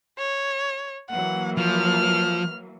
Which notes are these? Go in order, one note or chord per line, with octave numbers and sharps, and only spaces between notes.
C#5
E3 F#3 A#3 F#5
F3 F6